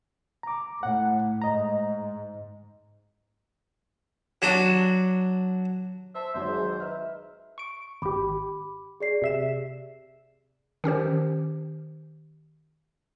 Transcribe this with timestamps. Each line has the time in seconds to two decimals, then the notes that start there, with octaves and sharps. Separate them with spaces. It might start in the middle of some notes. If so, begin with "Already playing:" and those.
0.43 A#5 D6
0.83 A2 F#5
1.42 G#2 D#5 A#5
4.42 F#3 D4 F#4
6.15 C5 E5 A5
6.34 G#1 F#3 C5 E5
6.47 G#2
6.80 D#4 B4 E5 F6
7.58 C#6 D7
8.02 G#1 G4 B5 D6
9.00 G#4 D5 C7
9.22 C3 E5 E7
10.84 D#3 C#4 G4 C5